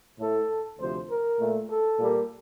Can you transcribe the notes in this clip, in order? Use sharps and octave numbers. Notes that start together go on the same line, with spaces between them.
A2 A3 A4
D2 C3 F3 C5
A#4
A#2 A3
A4
A#2 G3 A#3